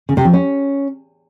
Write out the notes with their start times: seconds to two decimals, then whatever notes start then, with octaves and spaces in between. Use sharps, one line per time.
0.09 C#3
0.17 C3
0.25 F3
0.33 C#4